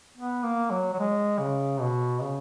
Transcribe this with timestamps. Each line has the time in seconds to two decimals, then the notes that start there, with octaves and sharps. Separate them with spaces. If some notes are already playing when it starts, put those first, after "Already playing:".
0.17 B3
0.43 A#3
0.71 F#3
0.93 F#3
0.99 G#3
1.39 C#3
1.81 B2
2.21 C#3